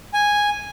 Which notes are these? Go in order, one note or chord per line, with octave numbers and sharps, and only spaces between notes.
G#5